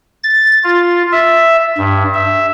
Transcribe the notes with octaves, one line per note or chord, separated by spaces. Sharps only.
A6
F4
E5
G2
E5